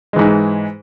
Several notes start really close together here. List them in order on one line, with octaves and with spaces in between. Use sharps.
G#3 E3 G#2